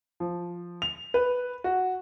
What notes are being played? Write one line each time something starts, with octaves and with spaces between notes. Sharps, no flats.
F3
F7
B4
F#4